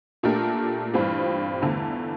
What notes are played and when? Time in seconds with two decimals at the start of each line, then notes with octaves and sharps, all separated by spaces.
0.23 A#2 A3 D4 G4 A#4
0.94 G2 E3 G3 C4 F4
1.62 E2 D3 A3